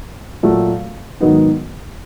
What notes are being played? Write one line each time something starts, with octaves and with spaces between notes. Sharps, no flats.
A#2 F#3 A3
G#2 D#3 F#3 B3 D#4